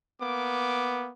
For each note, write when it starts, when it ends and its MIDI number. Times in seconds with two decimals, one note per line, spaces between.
0.21 1.09 58
0.21 1.11 59
0.21 1.09 86